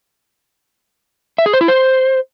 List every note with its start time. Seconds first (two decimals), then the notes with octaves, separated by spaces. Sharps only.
1.38 E5
1.46 G#4
1.53 C5
1.61 E4
1.68 C5